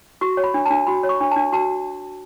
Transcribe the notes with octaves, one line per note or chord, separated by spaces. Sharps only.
F#4 C#6
C#5
B5
D4
D4 A5
F#4 B5
C#5
C#6
D4
D4 A5
F#4 A5